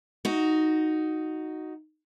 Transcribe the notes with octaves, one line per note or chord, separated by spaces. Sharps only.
D#4 F#4